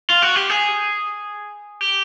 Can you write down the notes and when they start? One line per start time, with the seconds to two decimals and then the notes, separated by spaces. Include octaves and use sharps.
0.10 F4
0.22 F#4
0.36 G4
0.50 G#4
1.81 G4